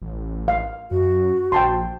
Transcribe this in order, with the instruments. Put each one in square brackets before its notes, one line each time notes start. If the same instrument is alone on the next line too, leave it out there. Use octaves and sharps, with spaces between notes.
[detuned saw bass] A1
[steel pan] F5
[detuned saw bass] F#2 [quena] F#4
[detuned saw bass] A#1 [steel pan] G5 A5 C6